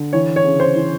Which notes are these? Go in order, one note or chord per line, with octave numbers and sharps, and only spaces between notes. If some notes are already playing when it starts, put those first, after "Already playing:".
Already playing: D3
E3 C#5
C#5
C#3
C5
E3